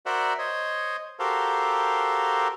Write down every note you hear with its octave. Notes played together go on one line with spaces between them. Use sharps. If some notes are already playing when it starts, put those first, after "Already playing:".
F#4 A#4 C5 D5 E5 F#5
C5 C#5 D#5
F#4 G4 A4 A#4 C5 F5